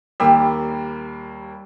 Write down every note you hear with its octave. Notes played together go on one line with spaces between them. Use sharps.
D#2 G3 A#3 E6